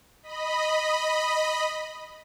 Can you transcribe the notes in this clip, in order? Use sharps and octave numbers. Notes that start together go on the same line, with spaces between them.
D#5 B5